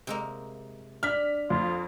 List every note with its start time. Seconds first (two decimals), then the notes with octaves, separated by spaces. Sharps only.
0.07 C3 G#3 A#3
1.03 D4 F6 B6
1.50 F2 F4